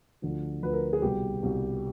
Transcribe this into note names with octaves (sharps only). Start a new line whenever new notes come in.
D2 D3 F3
D2 D3 F3 B4
A#4
G#4
C2 B2 G3 G4
C2 B2 G3